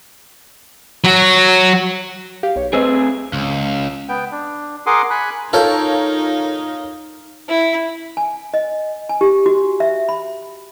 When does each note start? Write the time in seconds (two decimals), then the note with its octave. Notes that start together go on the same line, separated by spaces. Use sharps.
1.04 F#3 F#4
2.43 G4 F5
2.56 B1 C#5
2.73 A3 C4 G#4 B4 C5 D#5
3.33 C#2
4.09 B3 G5
4.31 D4
4.86 G#4 A#4 F#5 C6 D6 D#6
5.10 G#5 B5 F#6
5.53 D#4 F4 A4 A#4 C#5 F5 G5
7.49 E4
8.17 G#5
8.54 D#5
9.09 G#5
9.21 G4
9.46 F#4
9.80 E5
10.09 B5